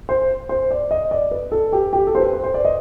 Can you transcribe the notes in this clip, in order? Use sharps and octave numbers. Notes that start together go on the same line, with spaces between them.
C5
C5
D5
D#5
D5
B4
A4
G4
G4
A4
C5
B4
C5
C5
D5
D#5